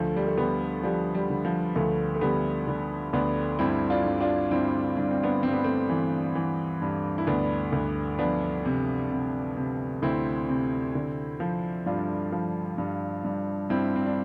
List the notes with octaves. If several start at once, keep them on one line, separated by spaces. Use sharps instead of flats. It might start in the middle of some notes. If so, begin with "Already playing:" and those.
Already playing: D2 F3 A3
G3
A3
D3 G3 B3
F3 G3
G3
D3
F3
D2 F3 A3
A3
D3 G3 B3
D3
D2 B3 D4
G2 C4 E4
D4 F4
G2
D4 F4
G2 C4 E4
G2 D4
C4
B3 D4
G2 C4
B3
A3 C4
E3
E3
G2
E4
D2 B3 D4
D2
F3 B3 D4
C3
C3
C3
D2 C4 E4
C3
D3
F3
G2 D4 F4
F3
G2
G2
G2 C4 E4
C4
D4